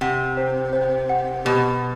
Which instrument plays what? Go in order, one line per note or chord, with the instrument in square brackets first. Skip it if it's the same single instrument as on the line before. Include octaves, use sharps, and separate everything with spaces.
[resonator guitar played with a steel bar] C3 [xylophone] F#5
[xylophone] C5
C5
F#5
[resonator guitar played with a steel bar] B2 [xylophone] G4